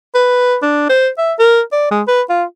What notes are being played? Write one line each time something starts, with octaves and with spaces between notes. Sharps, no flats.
B4
D4
C5
E5
A#4
D5
G#3
B4
F4